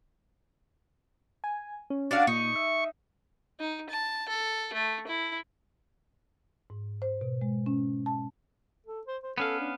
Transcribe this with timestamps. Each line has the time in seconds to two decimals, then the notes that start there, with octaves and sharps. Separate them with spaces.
1.44 G#5
1.90 C#4
2.11 D4 F#4 D5 F5
2.27 A#2 D#4 C#6
2.55 E5
3.60 D#4
3.90 A5
4.29 A4
4.73 A3
5.07 E4
6.70 G#2
7.02 C5
7.21 B2
7.41 G#3
7.66 C#4
8.06 A5
8.87 A4
9.07 C5
9.23 C5
9.38 B3 C#4 A4 F5
9.60 D4